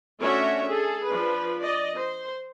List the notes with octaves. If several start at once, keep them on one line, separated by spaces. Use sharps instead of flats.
A3 C#4 D4 F#4 C#5 E5
G#4 A4
F3 D4 B4
D5 D#5
C5